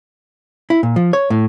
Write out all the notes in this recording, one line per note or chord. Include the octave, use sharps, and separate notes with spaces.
E4
A#2
F3
C#5
A2